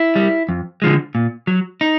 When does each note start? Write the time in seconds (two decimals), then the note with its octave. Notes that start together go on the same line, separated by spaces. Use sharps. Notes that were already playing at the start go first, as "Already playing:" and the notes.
Already playing: E4
0.16 G3
0.49 F2
0.82 D3 F3 G#3
1.15 A#2
1.47 F#3
1.81 D#4